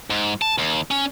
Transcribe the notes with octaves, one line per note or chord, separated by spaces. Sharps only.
G#2
A5
D#2
C#4